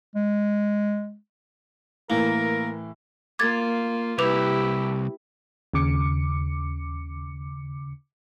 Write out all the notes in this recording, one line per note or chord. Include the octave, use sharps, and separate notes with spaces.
G#3
A2 E3 A#3 A#4
A#3 F4 D6 G#6 A6
C2 E4 G4 B4 D6 F7
D#2 C#3 D6 C#7